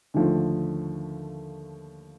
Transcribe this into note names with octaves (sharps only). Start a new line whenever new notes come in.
D#2 D3 F3 A3